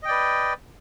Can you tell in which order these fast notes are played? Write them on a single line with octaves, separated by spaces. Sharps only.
D#5 G5 D5 B4